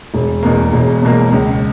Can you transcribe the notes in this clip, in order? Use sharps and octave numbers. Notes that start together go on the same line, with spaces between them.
E1
E2 B2 A#3
E1
E2 B2 A#3
C#2